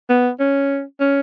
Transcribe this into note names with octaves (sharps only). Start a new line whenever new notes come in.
B3
C#4
C#4